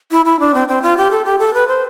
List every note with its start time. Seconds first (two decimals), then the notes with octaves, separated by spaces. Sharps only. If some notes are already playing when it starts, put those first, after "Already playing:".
0.11 E4
0.25 E4
0.40 D4
0.54 C4
0.68 C4
0.82 F4
0.97 G4
1.11 A4
1.25 G4
1.39 A4
1.54 B4
1.68 C5